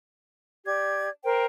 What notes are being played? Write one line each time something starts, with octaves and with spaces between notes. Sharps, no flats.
G4 D5 G#6
A#4 C5 G5